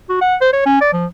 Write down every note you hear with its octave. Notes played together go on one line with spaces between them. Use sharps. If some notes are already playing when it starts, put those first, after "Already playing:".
F#4
F#5
C5
C#5
C#4
D5
F3